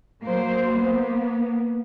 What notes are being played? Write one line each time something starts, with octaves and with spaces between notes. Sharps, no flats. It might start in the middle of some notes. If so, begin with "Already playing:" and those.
F#3 A#3 C5
A#3 B3